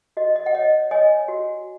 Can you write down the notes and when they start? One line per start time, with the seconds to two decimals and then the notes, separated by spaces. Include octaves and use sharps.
0.17 F#4 D#5
0.36 D#5
0.46 F#5
0.54 C#5 D#5
0.91 C#5 D#5 G#5
1.28 F#4